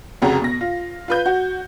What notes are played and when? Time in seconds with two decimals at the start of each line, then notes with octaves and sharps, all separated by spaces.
0.22 F1 F2 C#3 F#4 A#5
0.42 B2 A#6
0.61 F4
1.08 F4 B4 G6
1.26 F#4